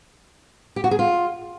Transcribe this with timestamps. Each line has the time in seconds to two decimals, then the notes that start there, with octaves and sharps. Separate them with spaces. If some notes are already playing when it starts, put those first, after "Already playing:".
0.76 G4
0.84 F#4
0.91 G#4
0.99 F4